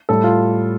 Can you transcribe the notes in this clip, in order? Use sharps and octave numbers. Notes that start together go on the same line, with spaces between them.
A2 G3 A4
F4